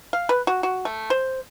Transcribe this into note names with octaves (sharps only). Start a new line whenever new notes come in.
F5
B4
F#4
F#4
A3
C5